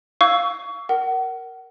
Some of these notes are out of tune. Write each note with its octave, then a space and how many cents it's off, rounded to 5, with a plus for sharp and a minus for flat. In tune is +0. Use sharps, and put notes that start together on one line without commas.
F5 +0 C#6 +25 E6 +0
A#4 +0 F#5 +30